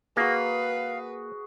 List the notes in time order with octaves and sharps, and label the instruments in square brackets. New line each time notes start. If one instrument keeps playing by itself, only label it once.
[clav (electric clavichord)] A#3 [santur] F#4 G#4 [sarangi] B4 [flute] F5